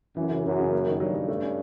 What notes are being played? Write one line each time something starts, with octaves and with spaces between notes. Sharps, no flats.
F#2 E3
C#3
F#2 C#3
C#3
A#3
D#3
G2 F#3
F#3
A3
C#4